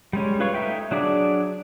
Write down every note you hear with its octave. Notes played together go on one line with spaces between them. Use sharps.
G3 G#3 C#4
F4 B4 C#5 F5 C#6
A3 D#4 E5 G5
F#3 D4 G#4 D5